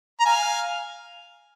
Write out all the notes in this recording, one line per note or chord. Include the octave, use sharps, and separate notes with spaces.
A#5
F5 G#5